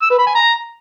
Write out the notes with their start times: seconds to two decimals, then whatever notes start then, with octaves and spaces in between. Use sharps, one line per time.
0.02 E6
0.10 B4
0.18 B5
0.27 G#5
0.35 A#5